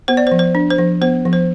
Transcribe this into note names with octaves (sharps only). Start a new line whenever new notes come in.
B3 C5
D5
C5
F3
C5
D4
C5
F3
B3 C5
F3
C5